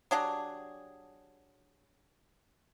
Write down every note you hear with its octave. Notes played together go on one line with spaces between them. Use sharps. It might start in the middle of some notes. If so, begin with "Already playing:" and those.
F#3 D4 G4 G#4